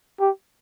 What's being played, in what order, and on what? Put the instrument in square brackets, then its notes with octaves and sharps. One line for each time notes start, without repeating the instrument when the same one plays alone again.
[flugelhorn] G4